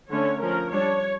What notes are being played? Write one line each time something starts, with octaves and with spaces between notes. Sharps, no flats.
D3 A3 C#4 C#5
F3 C#4 A#4
G3 D4 C#5